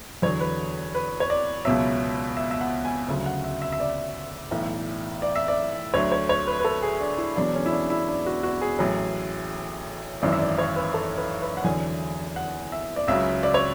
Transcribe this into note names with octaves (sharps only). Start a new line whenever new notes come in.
E2 D3 F#3 C#5
B4
B4
C#5
D5
C#2 B2 F#3 E5
E5
E5
F#5
G#5
D2 C#3 F#3
F#5
E5
E5
E5
D5
B1 A2 E3
D5
E5
D5
D2 D3 F#3 C#5
C#5
C#5
B4
B4
A4
G#4
D4
E4
E1 E2 B2 F#3 D4
C#4
E4
D4
E4
D4
F#4
F#4
G#4
A1 A2 F#3
G#1 F#2 E3 D5
E5
D5
C#5
B4
A4
B4
B4
F#5
E2 D3 F#3 G#5
F#5
E5
D5
C#2 C#3 F#3 E5
D5
C#5